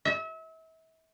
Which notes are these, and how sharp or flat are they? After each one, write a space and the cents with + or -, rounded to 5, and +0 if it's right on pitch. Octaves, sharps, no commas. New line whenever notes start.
E5 -35